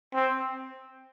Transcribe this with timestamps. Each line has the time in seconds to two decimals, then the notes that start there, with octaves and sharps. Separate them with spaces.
0.14 C4